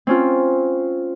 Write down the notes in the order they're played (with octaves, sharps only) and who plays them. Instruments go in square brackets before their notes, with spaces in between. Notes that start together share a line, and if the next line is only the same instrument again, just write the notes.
[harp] C4 C#4 F4